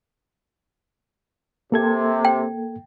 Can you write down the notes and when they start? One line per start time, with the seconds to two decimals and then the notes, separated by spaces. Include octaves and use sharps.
1.72 C3 A#3 A4 G#6
2.25 G5